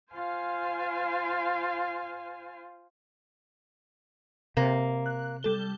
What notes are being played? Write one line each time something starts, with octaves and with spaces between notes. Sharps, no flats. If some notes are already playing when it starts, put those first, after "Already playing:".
F4 C5 F5 G#5
C3 A#3
F#6
G3 A4 G7